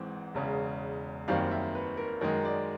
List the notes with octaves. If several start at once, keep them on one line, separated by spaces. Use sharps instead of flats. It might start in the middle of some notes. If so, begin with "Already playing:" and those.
Already playing: G#1 G#2 E3 C4
E1 E2 C#3
F#1 F#2 D#3 G3 C4 F5
E5
B4
A#4
F#2 D#3 G#3 A#4
D5